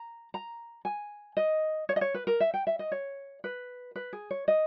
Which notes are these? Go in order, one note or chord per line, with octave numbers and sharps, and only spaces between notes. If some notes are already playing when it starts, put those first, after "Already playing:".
Already playing: A#5
A#5
G#5
D#5
C#5
D#5
C#5
B4
A#4
E5
G5
E5
D#5
C#5
B4
B4
G#4
C#5
D#5